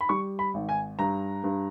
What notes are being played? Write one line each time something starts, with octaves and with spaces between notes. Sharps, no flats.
B5
G3 C#6
B5
G#1
G#5
G2 A#5
G2